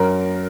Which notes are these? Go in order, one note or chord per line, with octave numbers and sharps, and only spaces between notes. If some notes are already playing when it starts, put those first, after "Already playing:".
Already playing: F#2 A#4